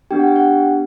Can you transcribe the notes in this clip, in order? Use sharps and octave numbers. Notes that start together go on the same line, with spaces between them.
B3 D4 G4 G5
F#5
G5
F#5